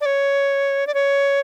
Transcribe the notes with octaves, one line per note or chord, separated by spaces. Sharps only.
D5
C#5
D5
C#5